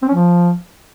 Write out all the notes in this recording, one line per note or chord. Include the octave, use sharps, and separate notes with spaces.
C4
C#4
F3